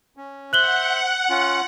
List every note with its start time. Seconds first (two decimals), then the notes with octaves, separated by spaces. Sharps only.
0.17 C#4
0.53 C5 E5 F#5 F#6 F#7 G7
1.30 C#4 F4